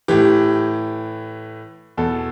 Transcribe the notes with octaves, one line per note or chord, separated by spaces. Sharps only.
A2 E3 G4
E2 B2 A4